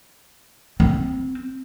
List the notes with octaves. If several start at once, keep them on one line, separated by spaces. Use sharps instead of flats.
C4